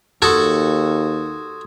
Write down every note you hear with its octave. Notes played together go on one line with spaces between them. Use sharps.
D#2 F#4 A4 C6 D#6 G#6